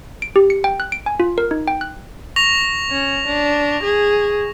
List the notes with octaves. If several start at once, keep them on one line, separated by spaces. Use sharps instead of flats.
D7
G4
C#7
G5
F#6
D7
G#5
F4
A#4
D#4
G5
F#6
C#6 A#6 F7
C#4
D4
G#4